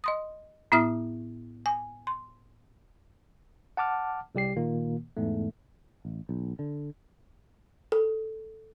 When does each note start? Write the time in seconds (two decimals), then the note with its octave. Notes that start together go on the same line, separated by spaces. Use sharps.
0.04 D#5 C6 D#6
0.72 A2 B3 E4 E5 D#6 F6
1.66 G#5
2.07 C6
3.77 F#5 A5 D6 F6
4.35 C2 G3 G4 C7
4.56 A#2 D#3 A#3
5.17 E2 G#2 A3
6.05 A1
6.29 B1
6.59 D3
7.92 A4